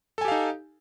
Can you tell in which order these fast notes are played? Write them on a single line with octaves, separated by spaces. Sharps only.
A4 G#5 G4 F5 D#4